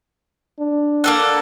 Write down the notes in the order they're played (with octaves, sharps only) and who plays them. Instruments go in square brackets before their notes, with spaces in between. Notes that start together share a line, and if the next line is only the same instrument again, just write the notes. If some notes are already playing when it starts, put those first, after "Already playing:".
[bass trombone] D4
[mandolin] A#3 A4 F#5